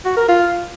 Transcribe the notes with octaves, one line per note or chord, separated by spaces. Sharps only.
F#4
A#4
F4